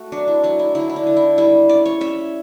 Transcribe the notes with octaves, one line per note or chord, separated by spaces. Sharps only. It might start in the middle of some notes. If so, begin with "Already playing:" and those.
Already playing: A3 F#4
F#3 D4
E4
F#3 D4
E4
D3 E4
E4
D4
D3
E4
G3 E4
C#4 D5
C#5
C#4 E5